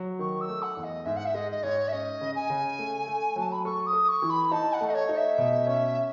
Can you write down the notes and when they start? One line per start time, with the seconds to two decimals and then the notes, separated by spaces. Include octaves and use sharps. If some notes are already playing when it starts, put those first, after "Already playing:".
Already playing: F#3
0.19 D#3 C#6
0.41 E6
0.48 A3
0.62 F#5
0.77 E2
0.84 D#5
1.05 G#2 E5
1.16 F#5
1.25 E5
1.34 G#3 D#5
1.52 D#5
1.63 G#2 C#5
1.88 E5
1.92 C#4 D#5
2.21 C#3
2.35 G#5
2.50 C#3
2.78 A3
3.07 A3
3.36 F#3 A5
3.52 B5
3.65 A4 C#6
3.87 D#6
3.93 A4
4.08 C#6
4.22 E3
4.30 B5
4.51 D#4 A5
4.73 F#5
4.80 A3
4.89 D#5
4.94 C#5
5.09 D#4
5.16 E5
5.38 B2
5.67 C#4